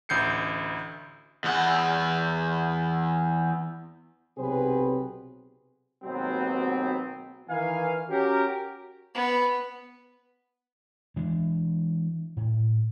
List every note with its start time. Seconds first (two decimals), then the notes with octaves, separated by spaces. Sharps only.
0.09 A1 D2 G6 C7 C#7
1.44 E2 F#5
4.38 B1 C3 F#3 C4 G#4 B4
6.04 D#2 G#2 B2 F#3 B3 C4
7.48 D#3 E3 F5 G#5
8.10 C#4 F#4 G4 A#4
9.15 B3
11.16 E3 G#3 D4
12.37 A2